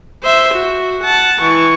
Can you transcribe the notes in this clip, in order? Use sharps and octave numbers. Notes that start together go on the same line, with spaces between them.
C5 E5
F#4
F#5 A5
E3 C#6